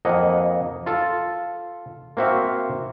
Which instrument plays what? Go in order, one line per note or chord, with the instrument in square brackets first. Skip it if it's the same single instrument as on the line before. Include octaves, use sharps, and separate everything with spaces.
[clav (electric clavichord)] F2 A#3 D#5 F#5
F4 A4
A#3 C4 F#4 E5 F5